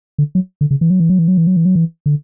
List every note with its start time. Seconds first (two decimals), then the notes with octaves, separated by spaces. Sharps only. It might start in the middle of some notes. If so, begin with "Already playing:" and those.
0.18 D3
0.35 F#3
0.61 D3
0.71 C#3
0.81 E3
0.90 F#3
1.00 E3
1.09 F#3
1.19 E3
1.28 F#3
1.38 E3
1.47 F#3
1.57 E3
1.65 F#3
1.75 E3
2.06 D3